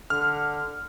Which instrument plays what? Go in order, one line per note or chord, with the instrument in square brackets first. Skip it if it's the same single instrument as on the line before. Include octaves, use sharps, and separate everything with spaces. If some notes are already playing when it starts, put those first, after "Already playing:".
[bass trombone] D3 [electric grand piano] F6